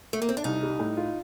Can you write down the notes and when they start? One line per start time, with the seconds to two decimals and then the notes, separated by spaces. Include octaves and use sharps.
0.13 A3
0.22 A#3
0.29 C4
0.37 D4
0.44 C2 D#4
0.63 G3
0.79 A2
0.97 F4